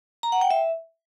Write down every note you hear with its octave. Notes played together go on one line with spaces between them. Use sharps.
A#5
F#5
G5
E5